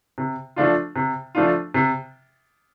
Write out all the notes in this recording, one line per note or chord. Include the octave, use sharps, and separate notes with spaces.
C3
F3 A3 D4 F4
C3
F3 A3 D4 F4
C3